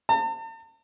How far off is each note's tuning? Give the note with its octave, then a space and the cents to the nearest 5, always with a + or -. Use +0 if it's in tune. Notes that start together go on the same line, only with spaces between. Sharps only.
A5 +45